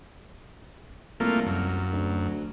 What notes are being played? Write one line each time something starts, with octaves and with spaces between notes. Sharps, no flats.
C2 A3 A#3 F4
F#2
D2